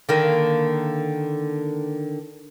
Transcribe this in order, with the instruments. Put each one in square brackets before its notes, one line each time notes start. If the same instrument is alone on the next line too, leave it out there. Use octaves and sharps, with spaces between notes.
[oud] D3 D#3 A#3